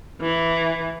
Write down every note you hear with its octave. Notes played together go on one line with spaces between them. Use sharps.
E3